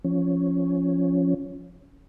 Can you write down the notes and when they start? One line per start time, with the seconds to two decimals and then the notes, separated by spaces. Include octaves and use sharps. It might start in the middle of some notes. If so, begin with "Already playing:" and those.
0.04 F3 C#4